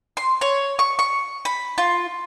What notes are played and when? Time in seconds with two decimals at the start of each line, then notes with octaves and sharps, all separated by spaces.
0.17 C6
0.41 C#5
0.79 C#6
0.99 C#6
1.45 B5
1.78 F4